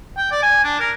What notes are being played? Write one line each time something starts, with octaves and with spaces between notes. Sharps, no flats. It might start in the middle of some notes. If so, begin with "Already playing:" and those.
G5
D5
G#5
D4
A#4